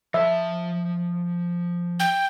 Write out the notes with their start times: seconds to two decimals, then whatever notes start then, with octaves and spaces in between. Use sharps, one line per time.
0.14 F3 E5 A5
2.00 G5